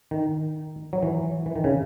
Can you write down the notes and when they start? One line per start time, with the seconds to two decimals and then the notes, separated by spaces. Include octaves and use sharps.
0.11 D#3
0.93 F#3
1.03 E3
1.46 E3
1.56 D#3
1.64 C#3